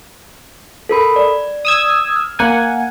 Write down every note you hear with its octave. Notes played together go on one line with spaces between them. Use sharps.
A4 A#4 B5
D5
D#6 E6 G#6
F6
A#3 F#5 G#5